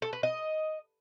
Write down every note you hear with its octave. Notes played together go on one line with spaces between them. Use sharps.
A4
B4
D#5